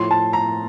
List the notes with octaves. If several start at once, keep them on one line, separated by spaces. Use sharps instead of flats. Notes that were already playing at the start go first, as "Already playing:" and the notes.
Already playing: A2 F3 C6
A5
A#5